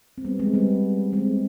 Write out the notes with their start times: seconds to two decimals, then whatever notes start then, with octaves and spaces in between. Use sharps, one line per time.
0.18 C4
0.25 G3 B3
0.39 G#3 C4
0.54 G3 B3
1.12 G#3 C4